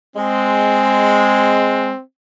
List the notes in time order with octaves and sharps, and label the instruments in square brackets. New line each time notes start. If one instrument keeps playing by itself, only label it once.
[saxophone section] G#3 [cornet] C4